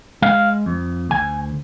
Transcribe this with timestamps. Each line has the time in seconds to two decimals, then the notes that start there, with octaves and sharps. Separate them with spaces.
0.22 G#3 F5
0.66 F2
1.10 D2 G#5